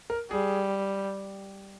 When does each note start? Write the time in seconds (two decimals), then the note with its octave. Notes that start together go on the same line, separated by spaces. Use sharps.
0.10 A#4
0.31 G3 G#4